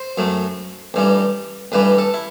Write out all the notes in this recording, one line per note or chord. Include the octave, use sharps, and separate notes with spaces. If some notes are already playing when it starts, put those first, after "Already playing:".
Already playing: C5
F#2 F#3 A3
A1 G2 E3 G3
A1 G2 E3 G3 B4
A4
E4